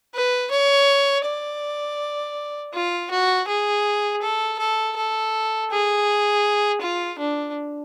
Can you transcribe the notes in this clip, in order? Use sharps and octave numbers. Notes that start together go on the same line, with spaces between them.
B4
C#5
D5
F4
F#4
G#4
A4
A4
A4
G#4
F4
D4